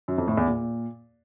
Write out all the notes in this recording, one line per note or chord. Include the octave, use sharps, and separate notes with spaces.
F#2
F2
A2
E2
A#2